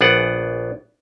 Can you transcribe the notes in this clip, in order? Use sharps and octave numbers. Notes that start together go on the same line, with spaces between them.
A#1 B3 G#4 D5 F#5